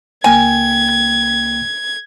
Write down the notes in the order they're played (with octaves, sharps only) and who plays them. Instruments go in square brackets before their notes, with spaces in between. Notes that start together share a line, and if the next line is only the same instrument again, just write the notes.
[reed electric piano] C#2 A#3 G5 [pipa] G#5 [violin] G#6